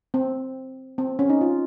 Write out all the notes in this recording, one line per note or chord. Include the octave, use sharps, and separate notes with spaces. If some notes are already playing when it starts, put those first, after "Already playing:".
C4
C4
C#4
D#4
F4